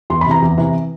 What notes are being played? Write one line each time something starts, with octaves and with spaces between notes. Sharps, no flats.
E2 C6
B5
C3 E3 A#5
E2
C3 E3